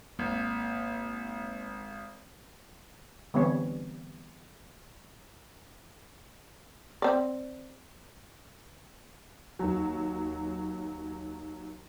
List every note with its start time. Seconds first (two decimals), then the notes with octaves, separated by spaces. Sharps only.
0.19 G#1 A#3
3.34 D3 E3 G3 B3 C4 C#5
7.02 C4 D5
9.59 D#2 F#3